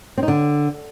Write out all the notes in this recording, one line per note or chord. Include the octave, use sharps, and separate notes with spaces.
C4
D#4
D3